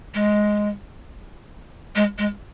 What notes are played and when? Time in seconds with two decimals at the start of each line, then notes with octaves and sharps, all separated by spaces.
0.14 G#3
1.95 G#3
2.18 G#3